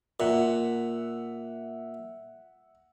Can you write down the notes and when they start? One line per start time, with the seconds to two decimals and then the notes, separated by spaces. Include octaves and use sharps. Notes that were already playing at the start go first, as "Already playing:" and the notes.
0.20 A#2 E5 F#5